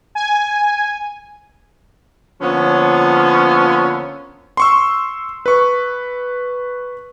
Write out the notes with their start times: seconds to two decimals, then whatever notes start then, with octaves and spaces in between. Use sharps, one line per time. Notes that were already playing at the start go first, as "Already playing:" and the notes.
0.15 G#5
2.42 D3 F3 A#3 B3 C#4
4.57 C6 C#6 E6
5.46 B4 C#6